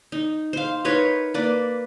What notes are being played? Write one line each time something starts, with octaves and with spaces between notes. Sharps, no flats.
D#4
C5 F5
D#4 A#4 B4 C#5
A#3 B4 D5